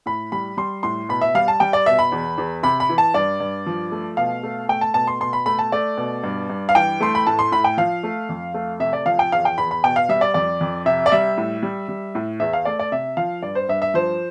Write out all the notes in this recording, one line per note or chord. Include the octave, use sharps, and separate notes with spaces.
A2 B5
G3 B5
G3 C6
A2 C6
B2 B5
E5
G3 F5
A5
G3 G5
D5
B2 E5
B5
E2
E2
C3 B5
B5
E3
A5
G2 D5
G2
F3
A3
B2 F5
A3
A3 G5
A5
B2 A5
C6
B2 C6
B5
A3 B5
A5
A3 D5
B2
G2
G2
F5
E3 G5
A3 C6
B5
A2 A5
C6
A2 B5
G5
F3 F5
A3
F2
A3
C3 E5
D5
F3 F5
G5
E2 F5
G5
E2 B5
B5
B2 G5
F5
G3 E5
D5
F2 D5
F2
C3 E5
D5
G3 E5
A2
G3
G3
A2
E2 E5
F5
A3 D5
D5
C3 E5
F3 F5
G2 D5
C5
G2 E5
E5
F3 C5